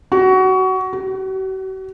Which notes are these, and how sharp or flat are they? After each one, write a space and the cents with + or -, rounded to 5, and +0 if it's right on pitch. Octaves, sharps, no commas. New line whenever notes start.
F#4 +20
F#4 +45